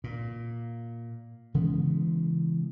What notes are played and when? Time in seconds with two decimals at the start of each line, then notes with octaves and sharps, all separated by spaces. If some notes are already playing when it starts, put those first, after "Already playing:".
0.04 A#2
1.54 C#3 E3 G#3 B3